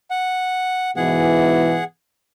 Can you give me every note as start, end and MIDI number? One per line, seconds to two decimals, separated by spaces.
0.11 0.91 78
0.97 1.80 44
0.97 1.80 47
0.97 1.80 52
0.97 1.84 68
0.97 1.84 78